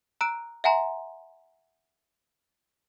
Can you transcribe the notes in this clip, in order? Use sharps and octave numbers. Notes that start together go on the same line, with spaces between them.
A#5 E6 F#6 D7
E5 F#5 G#5 A#5 C6